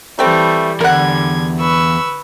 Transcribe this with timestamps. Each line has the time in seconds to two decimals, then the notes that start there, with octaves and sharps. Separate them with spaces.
0.19 E3 G3 A3 C4
0.81 E2 D3 G3 A#4 F#5 G#6
1.60 B4 C#6 E6